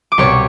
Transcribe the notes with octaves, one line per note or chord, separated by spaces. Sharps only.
D6
C2 B2 C#5 C#6